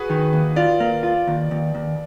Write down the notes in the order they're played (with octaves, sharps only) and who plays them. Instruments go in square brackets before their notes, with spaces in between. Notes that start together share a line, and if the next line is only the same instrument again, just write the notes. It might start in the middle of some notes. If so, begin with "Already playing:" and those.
Already playing: [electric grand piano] F#4 G#4 B4
[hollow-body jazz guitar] D#3
D#2
[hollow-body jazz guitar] F4 [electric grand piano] D5
[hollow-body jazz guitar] A#3
F4
D#2
D#2
D#2